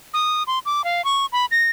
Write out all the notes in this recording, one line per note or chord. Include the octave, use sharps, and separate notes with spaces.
D#6
C6
D6
F5
C#6
B5
A#6